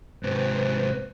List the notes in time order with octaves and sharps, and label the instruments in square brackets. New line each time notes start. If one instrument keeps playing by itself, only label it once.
[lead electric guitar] G#2 C3 [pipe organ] B4 C5